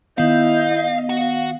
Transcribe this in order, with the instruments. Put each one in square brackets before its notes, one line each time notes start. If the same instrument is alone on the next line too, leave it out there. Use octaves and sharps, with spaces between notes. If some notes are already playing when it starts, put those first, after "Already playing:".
[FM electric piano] D#3 B3 [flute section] E4 G6 [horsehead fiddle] D#5 [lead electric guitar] F5
[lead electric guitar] F#4 [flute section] F5